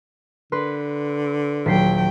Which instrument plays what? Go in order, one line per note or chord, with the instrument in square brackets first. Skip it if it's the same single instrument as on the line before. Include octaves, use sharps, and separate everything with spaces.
[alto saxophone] D3 [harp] B4 C6
[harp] D#1 B6 C7 [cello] F#3 G5